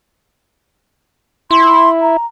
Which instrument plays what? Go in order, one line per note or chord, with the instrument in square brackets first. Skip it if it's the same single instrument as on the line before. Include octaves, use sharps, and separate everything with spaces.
[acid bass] E4 [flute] C6
[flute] A#5